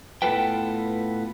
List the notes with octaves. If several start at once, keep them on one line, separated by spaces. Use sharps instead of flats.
A2 B3 F4 A4 B4 G5